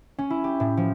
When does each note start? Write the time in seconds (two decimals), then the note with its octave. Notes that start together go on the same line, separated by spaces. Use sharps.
0.18 C#4
0.30 E4
0.44 G4
0.60 A2
0.77 F3